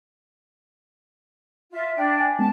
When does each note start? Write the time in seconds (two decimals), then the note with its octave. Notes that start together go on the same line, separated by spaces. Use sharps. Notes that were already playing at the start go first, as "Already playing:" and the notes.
1.71 F4 E5
1.96 D4 G5
2.21 G#5
2.39 G#3 B3 C#4 A5